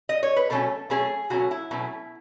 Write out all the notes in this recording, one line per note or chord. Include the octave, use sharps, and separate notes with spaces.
D#5
C#5
B4
B2 F#3 A3 C#4 A4
B2 F#3 A3 C#4 G#4
B2 F#3 A3 C#4 F#4
E4
B2 F#3 A3 C#4